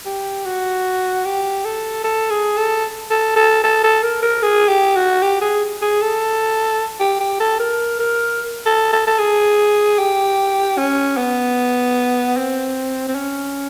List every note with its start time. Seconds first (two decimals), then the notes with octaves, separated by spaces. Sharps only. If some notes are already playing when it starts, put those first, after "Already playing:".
0.06 G4
0.45 F#4
1.25 G4
1.65 A4
2.04 A4
2.30 G#4
2.57 A4
3.10 A4
3.36 A4
3.63 A4
3.83 A4
4.03 A#4
4.22 A#4
4.42 G#4
4.68 G4
4.96 F#4
5.22 G4
5.41 G#4
5.82 G#4
6.02 A4
7.00 G4
7.20 G4
7.40 A4
7.59 A#4
8.00 A#4
8.66 A4
8.92 A4
9.07 A4
9.19 G#4
9.99 G4
10.78 C#4
11.17 B3
12.37 C4
13.08 C4
13.15 C#4